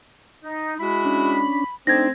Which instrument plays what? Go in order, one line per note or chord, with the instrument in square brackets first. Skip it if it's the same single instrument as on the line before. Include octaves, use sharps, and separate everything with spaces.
[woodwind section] D#4
[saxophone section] G#3 E4 F#4 [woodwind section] B5
[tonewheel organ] C#4 D4
[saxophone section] A3 C4 [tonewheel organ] D4 D#4 [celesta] G#6 A#6